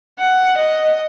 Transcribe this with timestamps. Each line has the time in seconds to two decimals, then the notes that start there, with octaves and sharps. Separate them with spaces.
0.19 F#5
0.57 D#5